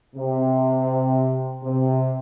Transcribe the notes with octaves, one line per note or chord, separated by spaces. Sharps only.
C3
C3